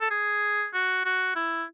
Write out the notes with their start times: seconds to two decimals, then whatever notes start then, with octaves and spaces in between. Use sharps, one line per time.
0.01 A4
0.10 G#4
0.74 F#4
1.05 F#4
1.36 E4